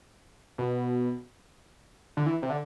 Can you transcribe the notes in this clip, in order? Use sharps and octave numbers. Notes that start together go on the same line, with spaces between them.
B2
D3
E3
C3
D3